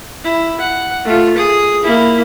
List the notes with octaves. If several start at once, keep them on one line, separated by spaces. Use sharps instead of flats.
E4
F#5
A3 F4
G#4 D#6
A#3 E4